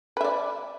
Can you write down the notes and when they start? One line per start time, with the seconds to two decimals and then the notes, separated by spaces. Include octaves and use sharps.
0.17 B4
0.21 E5
0.24 D5